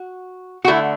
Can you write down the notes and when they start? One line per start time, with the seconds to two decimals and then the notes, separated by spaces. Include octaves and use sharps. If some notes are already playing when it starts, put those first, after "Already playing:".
Already playing: F#4
0.64 F#4
0.68 D3 A3 E4